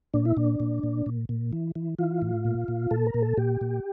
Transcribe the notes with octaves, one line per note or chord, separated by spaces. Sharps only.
A#2 D4
E4
A#2 D4
A#2
A#2
A#2
A#2
E3
E3
E3 F4
A2
A#2
A#2
A#2 A4
A#4
A#2
A4
A#2 G4
A#2